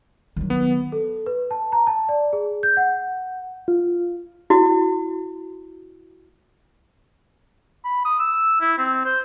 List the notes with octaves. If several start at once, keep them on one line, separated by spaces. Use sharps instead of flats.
D#3 F#3
B3
A4
B4
A5
A#5
A5
D5
G#4
G6
F#5
F4
E4 F#4
B5
D#6
E6
E4
C4
C5